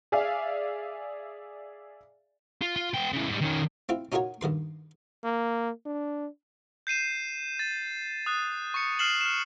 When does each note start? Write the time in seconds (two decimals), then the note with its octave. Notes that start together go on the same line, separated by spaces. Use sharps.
0.12 G#4 D5 E5 F5 G#5
2.62 F4
2.76 F4
2.94 B3 G5
3.12 C#3 E3
3.29 G#2 G3
3.42 D#3 C#4
3.89 C4 E4 F4
4.12 C#4 D#4 F4 F#4 A#4 C#5
4.41 G2 D#3 B4 C6
5.24 A#3
5.86 D4
6.87 G6 C7 D#7 E7
7.59 A6
8.26 D#6 F#6
8.74 C#6 C#7
8.99 F6 C7 E7 F#7
9.21 F6 E7